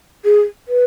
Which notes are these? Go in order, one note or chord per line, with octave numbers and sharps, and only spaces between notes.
G#4
B4